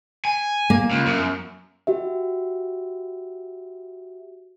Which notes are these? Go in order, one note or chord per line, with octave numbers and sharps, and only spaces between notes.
G#5
A#3
C#2
F#2
F#4 G4 E5